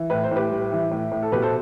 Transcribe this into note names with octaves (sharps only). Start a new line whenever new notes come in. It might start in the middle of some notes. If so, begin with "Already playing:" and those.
Already playing: E3
A2 B4
C5
A2 G4 B4
G3
E3
A2
A2
A4
B2 G4 B4
A4 C5